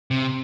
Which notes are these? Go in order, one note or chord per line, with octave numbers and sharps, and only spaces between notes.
C3